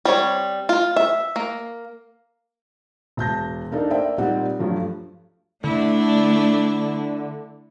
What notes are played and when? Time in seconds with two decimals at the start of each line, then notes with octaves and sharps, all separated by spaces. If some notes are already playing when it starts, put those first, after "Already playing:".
0.05 G3 C4 C#5
0.69 F4
0.96 E5
1.36 A#3
3.17 E1 A5 G6 A#6
3.72 A#3 D4 D#4 A4
3.90 A#3 C5 D5 E5 G5
4.18 A#2 G3 C4 D#4 F#5
4.59 G2 F3 F#3 A3
5.64 D3 A3 D4 E4